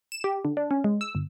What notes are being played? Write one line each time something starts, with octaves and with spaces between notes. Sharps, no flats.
E7
G4
D3
D4
C#4
G#3
E6
G1